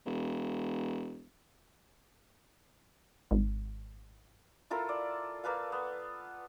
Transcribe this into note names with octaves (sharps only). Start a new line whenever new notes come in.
E1
G#1
E4 F4 A4 A#4
D5
A#3 A4 B4 F5
B3